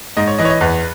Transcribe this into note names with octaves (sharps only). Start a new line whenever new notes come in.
G#2 D#5
C#5
E3 D#5
C#5
D#5
E2 B4